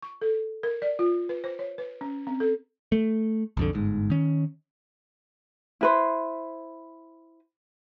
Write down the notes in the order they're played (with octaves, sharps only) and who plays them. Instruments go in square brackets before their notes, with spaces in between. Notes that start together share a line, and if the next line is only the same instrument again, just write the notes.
[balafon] C#6
A4
A#4
D5
F4
B4
C5
C#5
B4
C#4
C4
A4
[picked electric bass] A3
B1 F2 D3
G1 G#2
D#3 C#4
[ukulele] E4 B4 C5